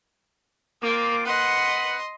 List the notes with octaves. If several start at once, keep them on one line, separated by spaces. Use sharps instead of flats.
A#3 C4 F4 D6
B4 D#5 F#5 C6